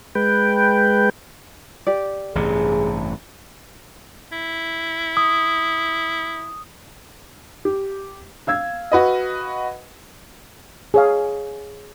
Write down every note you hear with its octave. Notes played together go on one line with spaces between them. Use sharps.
G#3 B4 G5
G4 D5
A1 G2 C3 G#4
E4
D#6
G4
F5 E6 G#6
F#4 B4 D#5
G#4 C#5 F5